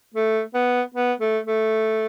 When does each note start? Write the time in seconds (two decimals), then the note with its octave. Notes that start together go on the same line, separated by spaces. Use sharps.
0.14 A3
0.54 B3
0.94 B3
1.20 A3
1.46 A3